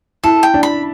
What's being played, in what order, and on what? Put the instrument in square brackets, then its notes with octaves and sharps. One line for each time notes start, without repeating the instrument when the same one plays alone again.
[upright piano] E4 [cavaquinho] A4
[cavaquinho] G5
[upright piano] D4
[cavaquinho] B5